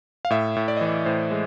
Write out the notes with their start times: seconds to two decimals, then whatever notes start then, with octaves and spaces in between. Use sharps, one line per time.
0.25 F5
0.30 A2 E5
0.56 A2
0.68 D5
0.77 D#5
0.81 E3
0.87 D5
1.05 A2 C5
1.31 G#3